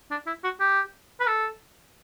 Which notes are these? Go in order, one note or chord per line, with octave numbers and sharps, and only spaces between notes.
D4
E4
F#4
G4
B4
A4